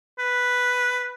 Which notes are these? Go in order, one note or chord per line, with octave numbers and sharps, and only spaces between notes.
B4